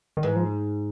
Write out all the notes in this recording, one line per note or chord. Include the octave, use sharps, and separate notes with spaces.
D#3
G#2 E3
F3